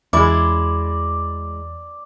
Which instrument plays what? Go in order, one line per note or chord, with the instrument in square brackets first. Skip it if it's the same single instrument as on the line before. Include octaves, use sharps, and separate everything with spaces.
[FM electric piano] E2 [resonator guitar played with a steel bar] G#3 E4 [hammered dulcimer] D5 [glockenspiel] D6